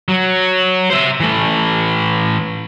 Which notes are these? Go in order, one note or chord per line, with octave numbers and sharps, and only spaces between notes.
F#3
C5 E5
E3 A3